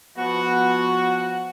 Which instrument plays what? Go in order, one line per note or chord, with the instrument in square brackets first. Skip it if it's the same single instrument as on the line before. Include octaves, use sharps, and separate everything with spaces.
[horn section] F3 F#4 [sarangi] B3